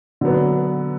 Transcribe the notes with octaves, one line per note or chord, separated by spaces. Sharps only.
D3 F#3 B3